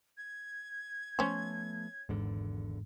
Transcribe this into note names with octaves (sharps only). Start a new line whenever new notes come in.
G#6
F3 A3 B3 C#4 C5
G#1 E2 G#2 D3